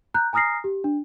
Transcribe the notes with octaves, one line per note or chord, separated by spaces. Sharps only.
A#5 F#6 G6
G#5 A#5 D#6 F6 A#6 C7
G4
D4